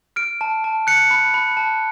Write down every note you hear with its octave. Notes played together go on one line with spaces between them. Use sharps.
F6 D7
A5
A5
F#6 C#7
B5
B5
A5